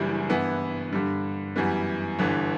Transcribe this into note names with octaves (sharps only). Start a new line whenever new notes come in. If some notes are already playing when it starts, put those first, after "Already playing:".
Already playing: F#1 F#2 E3 G3 D4
G2 E3 B3 E4
G2 D3 G3
F#2 E3 G3 B3
G1 G2 E3